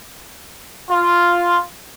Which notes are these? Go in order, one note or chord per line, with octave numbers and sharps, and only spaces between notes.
F4